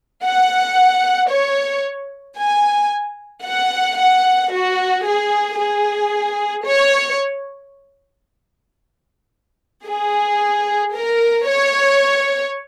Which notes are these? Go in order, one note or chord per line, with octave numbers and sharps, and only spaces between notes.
F#5
C#5
G#5
F#5
F#5
F#4
G#4
G#4
C#5
G#4
A#4
C#5